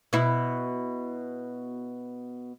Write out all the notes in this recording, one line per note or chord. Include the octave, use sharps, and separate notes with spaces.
B2 E4